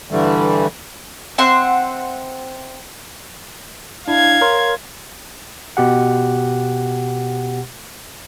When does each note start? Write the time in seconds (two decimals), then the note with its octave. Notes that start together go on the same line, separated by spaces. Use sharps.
0.10 G2 D3 E3 G3 A3
1.38 C4 E5 F#5 C6
4.08 D4 E4 F5 G#6
4.41 A#4 C#5 C6
5.77 B2 G4 F#5